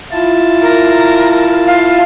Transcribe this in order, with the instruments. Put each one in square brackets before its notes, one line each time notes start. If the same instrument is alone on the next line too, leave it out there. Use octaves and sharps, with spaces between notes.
[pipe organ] E4 F4 A5
[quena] A#4
F5